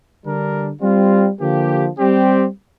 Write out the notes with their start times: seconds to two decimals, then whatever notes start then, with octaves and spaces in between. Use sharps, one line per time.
0.22 D3 G3 D4 A#4
0.81 G3 C4 F4
1.40 D3 F3 A#3 G4
1.99 G3 C4 G4